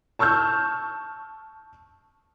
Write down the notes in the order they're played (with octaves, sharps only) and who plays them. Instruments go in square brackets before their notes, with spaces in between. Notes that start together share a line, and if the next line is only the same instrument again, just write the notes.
[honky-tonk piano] A5 C#6 E6 F6 G6